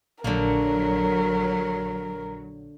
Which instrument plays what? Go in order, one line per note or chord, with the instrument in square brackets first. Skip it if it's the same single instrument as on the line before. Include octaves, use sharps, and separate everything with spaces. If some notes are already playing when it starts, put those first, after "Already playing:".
[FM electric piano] A#1 [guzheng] D3 A#3 [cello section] F#3 [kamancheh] A#4